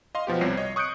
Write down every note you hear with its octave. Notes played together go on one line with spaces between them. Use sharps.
D#5 F5 C6
B2 F3 B3 G4
C2 C3 G3 C#5 A#6 C7
C#5 D#5
C#6 D#6 F#6 G6 C#7 D7